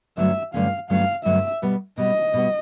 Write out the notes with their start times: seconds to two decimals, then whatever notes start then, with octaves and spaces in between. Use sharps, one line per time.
0.17 G2 D3 F#3 A3 C#4 E5
0.54 G2 D3 F#3 A3 C#4 F5
0.90 G2 D3 F#3 A3 C#4 F5
1.25 G2 D3 F#3 A3 C#4 E5
1.62 B2 G3 B3
1.98 B2 G3 B3 D#5
2.34 B2 G3 B3